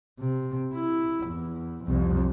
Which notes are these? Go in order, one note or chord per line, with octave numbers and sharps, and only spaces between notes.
C3
E4
E2
C2 F2